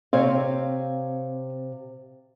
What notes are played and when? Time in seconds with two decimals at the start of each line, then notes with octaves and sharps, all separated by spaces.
0.13 C3 C4 C#5 F5